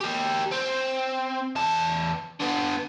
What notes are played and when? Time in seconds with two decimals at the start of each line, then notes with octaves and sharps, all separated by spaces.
0.01 G4 A#4
0.52 C4
1.56 E2 A5
2.40 D3 B3